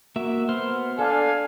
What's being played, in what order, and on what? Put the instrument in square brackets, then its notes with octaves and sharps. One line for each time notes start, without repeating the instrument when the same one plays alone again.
[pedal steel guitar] A#3 F#4 E5
B3 C5 F6
[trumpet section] D4 F5 G#5 [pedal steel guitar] A4